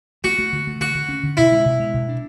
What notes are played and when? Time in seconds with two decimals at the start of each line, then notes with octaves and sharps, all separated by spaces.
0.24 A3 F#4
0.39 A3
0.53 D3
0.67 A3
0.81 D3 F#4
0.95 D3
1.09 C#4
1.23 D3
1.37 B2 E4
1.52 G#3
1.66 B2
1.80 G#3
1.94 B2
2.09 D4